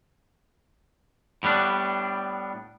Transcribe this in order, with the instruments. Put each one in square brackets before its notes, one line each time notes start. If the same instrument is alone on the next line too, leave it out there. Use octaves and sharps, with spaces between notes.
[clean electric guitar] A2 G3 B3 D4